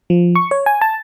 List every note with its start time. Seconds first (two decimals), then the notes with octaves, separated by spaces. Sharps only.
0.10 F3
0.36 C#6
0.51 C#5
0.66 G#5
0.81 A5